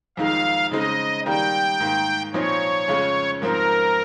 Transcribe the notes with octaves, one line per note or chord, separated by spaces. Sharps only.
F2 D#3 G#3 D#4 F5
C#3 G#3 C4 D#4 D#5
D#3 G3 A#3 D#4 G5
G#2 D#3 A#3
A#2 F3 C4 D#4 C#5
F2 C#3 G#3 C#4 F4
G#2 F3 C4 A#4